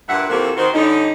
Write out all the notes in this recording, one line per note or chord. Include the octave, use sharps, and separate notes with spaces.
G2 A#2 E5 F#5
C3 E3 F3 A#3 F#4 A4
D#3 F#4 C5
D3 G3 C#4 D#4